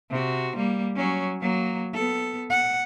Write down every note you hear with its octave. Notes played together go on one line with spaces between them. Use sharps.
C3 F#4
G3 A#3
F#3 C#4
F#3 A#3
B3 A4
F#5